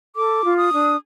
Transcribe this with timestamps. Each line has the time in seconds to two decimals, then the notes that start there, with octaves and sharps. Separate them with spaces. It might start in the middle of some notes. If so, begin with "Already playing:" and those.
0.15 A4 D6
0.43 F4
0.57 D#6
0.72 D4